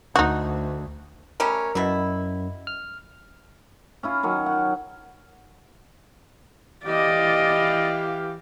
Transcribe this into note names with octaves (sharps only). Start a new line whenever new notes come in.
D2 D#4 F#4
G3 A3 C#4 A#4
F#2 B2 E4
F6
C#4 E4 F4
D#3 F#3 C#4
F#5
E3 G4 D5 D#5 F5